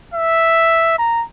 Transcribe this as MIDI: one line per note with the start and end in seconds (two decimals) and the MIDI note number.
0.14 0.97 76
0.98 1.24 82